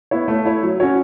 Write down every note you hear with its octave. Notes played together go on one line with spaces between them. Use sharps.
B3 E4 C#5
A3
E4 C#5
F#3
C#4 F#4 C#5